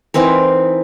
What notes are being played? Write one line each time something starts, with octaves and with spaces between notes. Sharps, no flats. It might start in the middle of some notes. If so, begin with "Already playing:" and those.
E3 C4 D#4 A#4